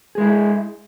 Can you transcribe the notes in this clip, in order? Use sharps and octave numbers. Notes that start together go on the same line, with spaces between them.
G#3 E4 G#4